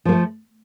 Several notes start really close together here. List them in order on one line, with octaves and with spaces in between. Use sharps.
F3 A#3 A3